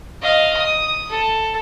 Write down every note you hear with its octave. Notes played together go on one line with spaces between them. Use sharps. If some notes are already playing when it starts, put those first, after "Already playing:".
D#5 F5
D#6
A4